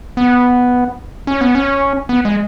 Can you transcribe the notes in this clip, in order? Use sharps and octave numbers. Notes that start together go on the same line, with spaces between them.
B3
C#4
B3
C#4
B3
G#3